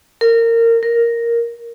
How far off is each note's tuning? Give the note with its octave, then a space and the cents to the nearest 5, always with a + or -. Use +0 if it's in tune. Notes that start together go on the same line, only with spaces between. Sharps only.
A#4 -20
A#4 +0